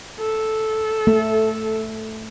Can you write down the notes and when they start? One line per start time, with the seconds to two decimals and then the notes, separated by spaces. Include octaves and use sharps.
0.20 A4
1.07 A3